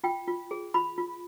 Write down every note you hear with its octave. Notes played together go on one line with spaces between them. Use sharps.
F4 G5
F4
G#4
F4 B5
F4